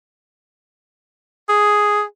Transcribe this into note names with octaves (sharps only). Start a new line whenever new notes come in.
G#4